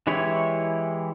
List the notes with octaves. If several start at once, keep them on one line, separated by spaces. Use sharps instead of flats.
E3 G#3 E4 G4 C#5